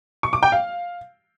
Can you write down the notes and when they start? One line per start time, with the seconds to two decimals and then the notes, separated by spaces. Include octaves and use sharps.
0.23 C#6
0.33 D6
0.43 G5
0.52 F5